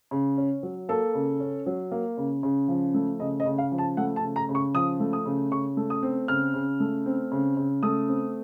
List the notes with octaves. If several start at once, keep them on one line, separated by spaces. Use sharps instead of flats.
C#3
C#4
F#3
A#3 A4
C#3
C#4
F#3
A#3
C#3
C#3
F3
A3
C#3 D#5
D#5
C#3
F5
F3
A5
A3 F#5
A5
C#3
A#5
C#3
C#6
F3 D#6
A3
D#6
C#3
C#3 C#6
A3
D#6
C4
C#3 F6
C#3
A3
C4
C#3
C#3
A3 D#6
C4